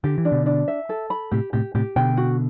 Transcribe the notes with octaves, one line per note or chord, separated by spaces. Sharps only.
D3 G4
E3
D4
B2 D3
D4
E5
A4
B5
A2 C3 G4
A2 C3 G4
A2 C3 G4
B2 D3 G5
F#4